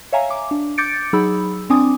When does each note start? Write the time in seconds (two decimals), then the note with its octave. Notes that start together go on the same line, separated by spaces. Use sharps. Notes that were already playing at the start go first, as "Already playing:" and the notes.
0.12 C#5 E5 F5 G#5 A#5
0.30 D6
0.51 D4
0.78 D6 G6 A6 C#7 D7
1.13 F#3 D#4 G#4 B5 E6
1.70 C4 D4 G#5 D6 D#6